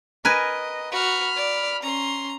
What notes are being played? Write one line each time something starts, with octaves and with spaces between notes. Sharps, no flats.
A#4 B4 D#5 G#5
F#4 B5 F6
D5
C#4 A#5 C6